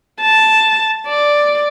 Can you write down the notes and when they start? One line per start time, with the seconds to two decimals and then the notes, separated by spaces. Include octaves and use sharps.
0.22 A5
1.07 D5